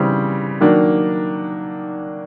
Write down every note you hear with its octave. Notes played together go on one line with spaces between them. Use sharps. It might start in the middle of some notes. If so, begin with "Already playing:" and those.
Already playing: C#3 E3 G3 C4
D#3 F#3 A#3 D4